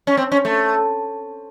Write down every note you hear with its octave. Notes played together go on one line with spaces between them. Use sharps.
C#4
C4
C#4
A3